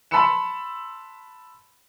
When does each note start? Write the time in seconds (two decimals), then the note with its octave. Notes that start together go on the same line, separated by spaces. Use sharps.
0.11 A5 B5 C6 E6 C#7 E7